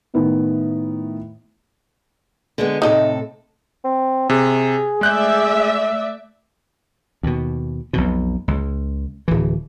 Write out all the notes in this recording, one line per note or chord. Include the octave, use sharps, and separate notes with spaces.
A2 D#3 B3
D3 G#3 B3
A2 C3 D#4 A4 D#5
C4
C3 G#4
G#3 A3 D5 E5 F#6 G6
D#2 B2
B1 F2 B2
C#2
D1 E3